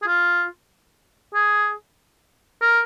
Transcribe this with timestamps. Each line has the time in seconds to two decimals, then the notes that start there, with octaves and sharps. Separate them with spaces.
0.02 G#4
0.07 F4
1.34 G#4
2.61 A#4